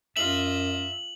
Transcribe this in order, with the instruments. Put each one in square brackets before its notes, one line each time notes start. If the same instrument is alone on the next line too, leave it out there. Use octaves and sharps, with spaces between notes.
[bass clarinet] F#2 [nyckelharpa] F4 D#5 [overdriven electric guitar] E5 [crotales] F#7